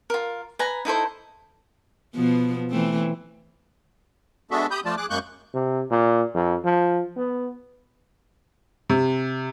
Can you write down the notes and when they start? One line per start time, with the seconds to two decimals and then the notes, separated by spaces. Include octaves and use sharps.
0.10 F4 A#4
0.59 B4 G#5 A#5
0.85 D#4 E4 A4 C5
2.15 B2 F3 B3
2.70 E3 A3 C4
4.51 G#3 B3 D4 F#4 A4 E5
4.71 G4 B5 D#6 G6
4.85 F3 A3 F4 D5 A5
4.97 G#4 D6 F#6
5.10 F#2 G#3 A#3 C#6 F#6 G6
5.54 C3
5.90 A#2
6.34 F2
6.65 F3
7.17 B3
8.90 C3